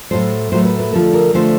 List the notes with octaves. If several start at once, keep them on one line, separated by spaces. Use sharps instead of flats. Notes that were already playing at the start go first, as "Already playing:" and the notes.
A2 F#3 A3 C5
A2 F#3 A3 C5
B4
B4
D3 F3 A3 A4
A#4
D3 F3 A3 C5